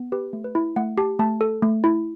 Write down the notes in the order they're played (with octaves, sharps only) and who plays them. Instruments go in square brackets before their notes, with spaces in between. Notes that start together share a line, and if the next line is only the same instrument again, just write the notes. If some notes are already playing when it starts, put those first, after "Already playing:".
Already playing: [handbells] B3
G4 B4
A3
B4
E4
A3 F#5
G4 A5
A3 A5
A4
A3
E4